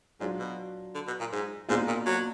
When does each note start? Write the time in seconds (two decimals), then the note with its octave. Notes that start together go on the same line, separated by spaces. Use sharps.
0.20 G#2 F#3 D4 F4
0.39 B2
0.95 D3
1.07 B2
1.20 A#2
1.32 G#2
1.69 G#2 B2 A#3 D4 F4
1.87 A#2
2.06 F#3